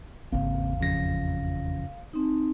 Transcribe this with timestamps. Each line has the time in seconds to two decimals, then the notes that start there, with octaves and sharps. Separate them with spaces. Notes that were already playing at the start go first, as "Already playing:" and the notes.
0.32 G#1 E2 C#3 A#3 C4 F5
0.80 F2 C#3 F3 C#4 A#6
2.14 C4 D#4